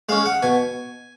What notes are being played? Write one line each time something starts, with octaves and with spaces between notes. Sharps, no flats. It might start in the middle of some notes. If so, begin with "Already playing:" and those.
G#3 C#4 F5
F#5
B2 G#5